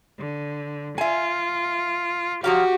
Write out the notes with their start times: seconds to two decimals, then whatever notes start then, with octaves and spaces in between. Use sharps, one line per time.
0.18 D3
0.98 F4 E5 G#5
2.44 F3 F#3 F#4 G4 F5